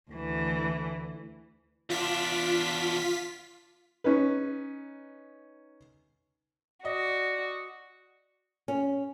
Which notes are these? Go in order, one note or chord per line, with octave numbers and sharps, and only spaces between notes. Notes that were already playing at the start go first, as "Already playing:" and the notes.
D2 E3
E2 D4 F4 B6
C#4 D#4 B4
F#4 D5 D#5
C#4